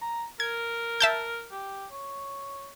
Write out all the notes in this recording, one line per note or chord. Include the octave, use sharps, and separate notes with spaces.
A#5
A#4 G#6
E5 A5 G6
G4
C#5